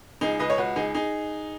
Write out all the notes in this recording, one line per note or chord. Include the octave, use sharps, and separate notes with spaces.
C#2 D#4 G#4
C#2 B4 D#5
C#5
C#2 F#4 B4
C#2 D#4 G#4
D#4 G#4